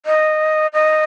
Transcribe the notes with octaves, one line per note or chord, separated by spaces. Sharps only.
D#5
D#5